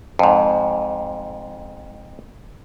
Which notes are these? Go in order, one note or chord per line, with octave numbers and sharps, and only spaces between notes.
F2 G#2